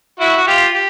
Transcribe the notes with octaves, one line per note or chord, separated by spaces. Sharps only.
E4 F#4
F#4
F4 G4
G4